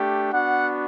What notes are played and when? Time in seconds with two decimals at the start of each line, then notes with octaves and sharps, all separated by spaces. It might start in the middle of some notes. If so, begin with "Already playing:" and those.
Already playing: A3 D4 G4
0.32 B3 D4 F#4 F#5